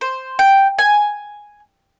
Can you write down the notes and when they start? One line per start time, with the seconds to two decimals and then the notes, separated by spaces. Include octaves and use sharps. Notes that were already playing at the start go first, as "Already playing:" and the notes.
0.01 C5
0.39 G5
0.79 G#5